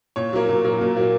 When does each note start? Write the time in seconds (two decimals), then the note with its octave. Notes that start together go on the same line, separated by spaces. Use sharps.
0.16 A#2 C#5
0.33 F#3 A#3
0.49 A#2
0.64 F#3 A#3
0.81 A#2
0.97 F#3 A#3